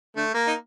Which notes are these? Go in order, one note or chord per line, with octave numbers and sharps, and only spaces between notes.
D3 A3
A#3
D#4